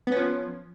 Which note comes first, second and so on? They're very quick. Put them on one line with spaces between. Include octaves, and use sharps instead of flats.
B3 C#4 F3